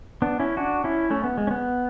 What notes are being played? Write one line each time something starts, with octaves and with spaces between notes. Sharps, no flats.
B3 D4
C#4 E4
D4 F#4
C#4 E4
A3 C#4
B3
G#3
C#4
B3